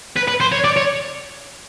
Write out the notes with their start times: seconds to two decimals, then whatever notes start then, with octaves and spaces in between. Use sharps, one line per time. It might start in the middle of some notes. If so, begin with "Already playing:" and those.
0.17 B4
0.28 B4
0.40 C5
0.52 C#5
0.64 D5
0.76 C#5